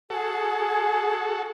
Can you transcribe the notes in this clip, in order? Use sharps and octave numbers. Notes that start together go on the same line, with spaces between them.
F#4 G#4 A4